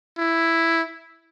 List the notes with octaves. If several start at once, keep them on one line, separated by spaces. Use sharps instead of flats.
E4